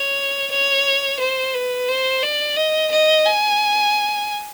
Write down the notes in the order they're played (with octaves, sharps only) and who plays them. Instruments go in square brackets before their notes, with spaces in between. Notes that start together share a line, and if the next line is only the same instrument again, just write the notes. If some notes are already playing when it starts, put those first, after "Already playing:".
Already playing: [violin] C#5
C#5
C5
B4
C5
D5
D#5
D#5
G#5